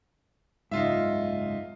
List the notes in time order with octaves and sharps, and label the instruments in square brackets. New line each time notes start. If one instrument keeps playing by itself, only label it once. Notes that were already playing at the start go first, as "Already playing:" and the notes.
[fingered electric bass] F#1 C#2 G#2 [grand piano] D#4 F4 E5